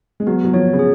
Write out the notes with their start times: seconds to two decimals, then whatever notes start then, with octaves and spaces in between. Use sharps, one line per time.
0.20 G#3
0.27 F#3 B3
0.44 F#3
0.53 F3 C#5
0.73 C#3
0.79 G#4